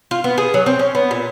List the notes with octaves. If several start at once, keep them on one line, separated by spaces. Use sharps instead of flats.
F4
B3
G#4
F#3
C4
C#4
B3
A#2